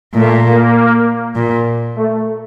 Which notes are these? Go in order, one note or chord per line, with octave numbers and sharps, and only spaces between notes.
A#2 A3
A#3
A#2
A3